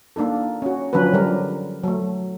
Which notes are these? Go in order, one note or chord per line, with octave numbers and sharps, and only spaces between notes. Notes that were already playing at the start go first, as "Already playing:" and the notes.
A#3 D4 D#4 A4
C#4 F#4
D3 F3 F#3 C#4 D4 B4
D3 G3 A#4
F#3 A3